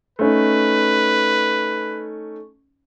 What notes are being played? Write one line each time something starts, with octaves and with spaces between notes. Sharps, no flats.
A3 C#4 D#4 B4